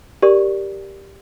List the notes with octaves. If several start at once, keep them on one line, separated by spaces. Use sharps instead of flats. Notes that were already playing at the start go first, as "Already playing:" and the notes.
G4 A#4 D5 C#6